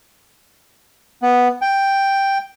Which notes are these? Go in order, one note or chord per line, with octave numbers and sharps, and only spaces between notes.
B3
G5